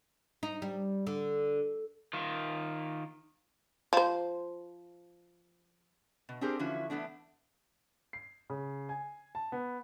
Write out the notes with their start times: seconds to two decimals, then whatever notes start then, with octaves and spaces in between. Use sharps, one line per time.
0.43 D#4
0.62 G3
1.07 D3
2.13 D#3 F4
3.93 F3 C5
6.29 B2
6.41 C4 D4 G4 G#4 A#4 C5
6.59 D3 E3 F3 C#4 E4 F#4
6.90 E3 A3 B3 D4
8.13 C7
8.50 C#3
8.89 G#5
9.35 A5
9.52 B3